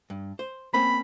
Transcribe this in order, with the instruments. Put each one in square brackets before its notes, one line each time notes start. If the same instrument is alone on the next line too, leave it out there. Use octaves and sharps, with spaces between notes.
[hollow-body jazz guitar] G2
C5
[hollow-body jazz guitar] A#3 C4 C#4 [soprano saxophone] B5